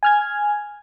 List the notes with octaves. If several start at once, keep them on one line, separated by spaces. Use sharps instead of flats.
G#5 F6 G#6